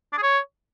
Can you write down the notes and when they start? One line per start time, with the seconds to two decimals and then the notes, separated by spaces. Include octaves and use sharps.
0.12 D4
0.17 G#4
0.22 C#5